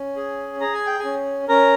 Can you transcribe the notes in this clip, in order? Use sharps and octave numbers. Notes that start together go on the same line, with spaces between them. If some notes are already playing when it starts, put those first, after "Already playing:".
Already playing: C#4
G#4
G#4 A#5
G#5
G5
G#4 G#5
C#4
C#4 A#4 A#5